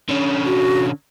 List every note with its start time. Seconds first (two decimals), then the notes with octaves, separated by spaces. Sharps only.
0.09 D3 C#4
0.45 F#4